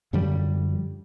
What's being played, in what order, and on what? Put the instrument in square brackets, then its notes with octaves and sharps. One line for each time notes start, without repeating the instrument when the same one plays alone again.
[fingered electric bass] F#2 D3 F3 G3